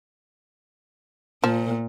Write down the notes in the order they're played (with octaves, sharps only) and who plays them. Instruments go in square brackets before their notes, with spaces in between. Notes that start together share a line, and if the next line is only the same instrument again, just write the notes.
[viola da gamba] A#2 [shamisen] F3